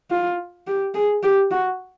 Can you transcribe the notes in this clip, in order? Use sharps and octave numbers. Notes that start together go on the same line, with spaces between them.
F4
G4
G#4
G4
F#4